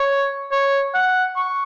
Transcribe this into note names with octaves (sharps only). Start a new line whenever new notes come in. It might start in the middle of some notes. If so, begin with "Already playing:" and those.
Already playing: C#5
C#5
F#5
C#6